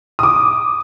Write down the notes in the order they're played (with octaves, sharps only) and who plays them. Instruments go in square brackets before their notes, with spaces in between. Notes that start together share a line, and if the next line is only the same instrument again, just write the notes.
[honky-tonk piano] D6 D#6